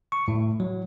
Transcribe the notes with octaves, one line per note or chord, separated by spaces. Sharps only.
C#6
A2
F#3